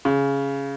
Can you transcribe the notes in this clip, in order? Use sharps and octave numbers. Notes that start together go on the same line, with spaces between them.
C#3